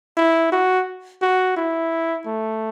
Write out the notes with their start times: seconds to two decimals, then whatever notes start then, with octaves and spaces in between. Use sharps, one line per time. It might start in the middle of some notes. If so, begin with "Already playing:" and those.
0.17 E4
0.52 F#4
1.22 F#4
1.57 E4
2.26 A3